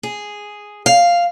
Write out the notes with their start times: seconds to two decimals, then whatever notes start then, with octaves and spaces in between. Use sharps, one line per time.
0.03 G#4
0.86 F5